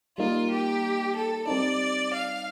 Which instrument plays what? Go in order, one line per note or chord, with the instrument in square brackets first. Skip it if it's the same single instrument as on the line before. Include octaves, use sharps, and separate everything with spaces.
[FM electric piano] G3 A#3 D#4 A#4 [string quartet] F4
[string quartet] G4
A4
[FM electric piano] G3 C4 D#4 [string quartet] D5
[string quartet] F5